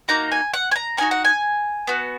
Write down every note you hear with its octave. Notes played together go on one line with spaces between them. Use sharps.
A#3 D#4 F#4 A#5
G#5
F#5
G#5
A#5
A#3 D#4 F#4 G#5
F#5
G#5
B3 F#4